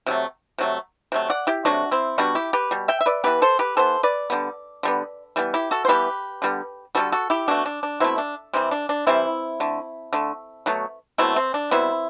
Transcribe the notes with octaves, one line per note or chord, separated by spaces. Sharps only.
C3 F#3 A3
C3 F#3 A3
C3 F#3 A3
D5 F#5
E4 G4
C3 F#3 A3 D4 F#4
C4 E4
B2 G3 B3 D4 F#4
E4 G4
G4 B4
B2 G3
E5 G5
E5
B4 D5
E3 B3 G4 B4
A4 C5
G4 B4
E3 B3 A4 C5
B4 D5
D3 G3 B3
D3 G3 B3
E3 G3 B3
E4 G4
F#4 A4
C5
E3 G3 B3 G4 B4
D3 G3 B3
D3 G3 B3 F#4 A4
F#4 A4
E4 G4
B2 A3 D4 F#4
D4
D4
B2 A3 C4 E4
D4
C3 E3 G3 C4
D4
D4
C3 E3 G3 C4 E4
D3 A3
D3 A3
B2 F#3 A3
B2 F#3 A3 C4 E4
C4
D4
B2 G3 B3 C4 E4